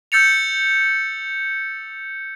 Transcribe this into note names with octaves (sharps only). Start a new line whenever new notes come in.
E6 G6 A6 C#7 F7